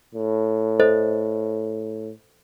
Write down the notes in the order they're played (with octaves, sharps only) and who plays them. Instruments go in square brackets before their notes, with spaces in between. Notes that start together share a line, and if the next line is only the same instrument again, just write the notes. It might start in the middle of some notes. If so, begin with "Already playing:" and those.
[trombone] A2
[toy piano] A4 C5 D#5